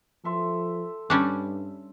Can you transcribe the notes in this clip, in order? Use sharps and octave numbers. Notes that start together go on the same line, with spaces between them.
F3 A4 E5 C6
G2 G3 C#4 D4